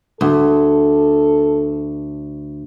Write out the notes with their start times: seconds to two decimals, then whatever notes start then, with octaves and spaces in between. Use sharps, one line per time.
0.21 D2 A4